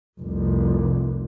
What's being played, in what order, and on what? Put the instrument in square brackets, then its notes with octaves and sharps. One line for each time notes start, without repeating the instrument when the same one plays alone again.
[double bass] F1 C2